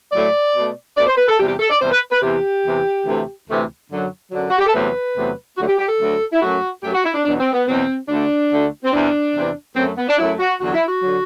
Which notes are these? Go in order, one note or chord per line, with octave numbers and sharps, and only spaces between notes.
A2 F#3 A3 D5
B2 A3
B2 A3 D5
C5
B4
A4
E2 C3 G3 G4
G4
A4
D5
E2 C3 G3 C5
B4
B4
E2 C3 E3 G4
E2 C3 E3
D2 C3 E3 A3
D2 C3 E3 A3
F#2 D3 F#3
F#2 D3 F#3
F#4
G4
A4
E2 C3 F#3 A3 B4
E2 C3 F#3 A3
D2 D3 F#3 A3 F#4
G4
G4
A4
D2 D3 F#3 A3
E4
F#2 F#3 A3 F#4
F#2 F#3 A3 G4
F#4
E4
D4
E2 B2 F#3 D4
C4
B3
E2 B2 F#3 C4
D2 D3 A3 D4
D2 D3 A3
C4
E2 C3 E3 D4
E2 C3 E3
F#2 F#3 A3 C4
B3
D4
F#2 F#3 A3 E4
F#4
E2 D3 F#3 F#4
E4
F#4
D3 F#3